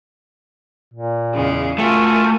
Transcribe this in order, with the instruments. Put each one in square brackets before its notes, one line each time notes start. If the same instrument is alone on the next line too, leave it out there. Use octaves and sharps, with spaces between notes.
[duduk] A#2
[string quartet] E2 C#3 G#3
[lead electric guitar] A3 [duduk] F4 [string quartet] F#4 A#4 G#5